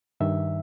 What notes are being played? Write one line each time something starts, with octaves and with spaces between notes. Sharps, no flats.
G2 D#3 E5